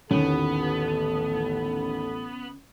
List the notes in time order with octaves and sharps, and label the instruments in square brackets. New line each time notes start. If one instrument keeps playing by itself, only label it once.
[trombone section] A1 A4 [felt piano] D#2 [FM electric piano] D3 C#4 [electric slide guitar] B3